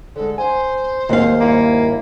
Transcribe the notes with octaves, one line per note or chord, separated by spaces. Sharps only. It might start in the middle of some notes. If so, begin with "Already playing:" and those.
D3 G#3 A4
C5 G#5
D#2 F#3 G#3 A#3 F5
G2 A#3 E4 C#5